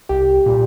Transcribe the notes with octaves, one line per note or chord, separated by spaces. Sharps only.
C2 G4
A#2 G3